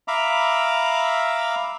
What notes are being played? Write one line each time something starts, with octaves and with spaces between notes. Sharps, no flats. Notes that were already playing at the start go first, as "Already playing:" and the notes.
E5 F5 A#5 B5 D6